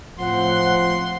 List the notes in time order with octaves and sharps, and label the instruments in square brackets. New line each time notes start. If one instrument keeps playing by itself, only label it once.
[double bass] A2 C4 [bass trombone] F3 [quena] F#5 [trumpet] C6